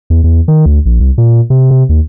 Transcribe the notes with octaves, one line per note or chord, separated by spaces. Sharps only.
E2
E2
D#3
D2
A#1
C2
A#2
C3
C3
D#2